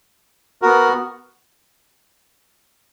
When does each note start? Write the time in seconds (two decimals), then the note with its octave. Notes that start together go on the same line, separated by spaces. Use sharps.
0.62 B3 F#4 A#4